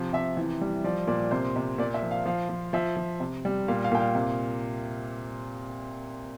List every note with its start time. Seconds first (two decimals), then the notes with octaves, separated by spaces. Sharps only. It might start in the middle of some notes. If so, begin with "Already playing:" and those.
Already playing: C3 F3
0.13 C3 E5
0.37 E3
0.61 G3
0.84 F3 D5
1.07 A#2 D5
1.31 C3 C5
1.56 C3
1.78 A#2 D5
1.94 E5
2.02 F3
2.11 F5
2.26 F3 F5
2.49 F3
2.73 F3 E5
2.96 F3
3.20 C3
3.45 G3
3.68 A#2 F5
3.84 F5
3.92 A#2 G5
4.00 F5
4.15 C3